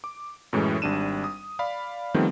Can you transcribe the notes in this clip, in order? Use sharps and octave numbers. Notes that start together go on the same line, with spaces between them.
D6
F#2 A2 E3 G#3
G#1 G3 D4 D#7 E7
D#6
D5 F5 B5
D#3 F3 G3 A3 B3 C4